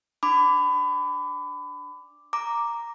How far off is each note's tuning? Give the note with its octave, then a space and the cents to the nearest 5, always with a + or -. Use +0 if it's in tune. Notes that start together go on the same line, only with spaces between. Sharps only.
D4 +0 B5 +30 D6 +0
A#5 +0 D6 +0